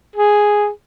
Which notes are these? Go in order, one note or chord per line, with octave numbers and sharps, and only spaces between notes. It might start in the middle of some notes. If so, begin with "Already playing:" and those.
G#4